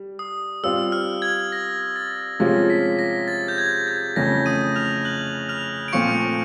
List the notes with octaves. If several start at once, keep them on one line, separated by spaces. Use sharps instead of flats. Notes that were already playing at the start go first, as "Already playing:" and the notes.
Already playing: G3
D#6
G3 C4 F4 E6
F6
G#6
A#6
A6
C3 F3 G#3 C#4 F4 A#6
B6
A#6
A6
G6
G#6
G#6
F2 C#3 E3 A3 C#4 A#6
D#6 D#7
F6 F7
F#6 F#7
F6 F7
D7
A#2 F3 A3 C4 F4 C#6 C#7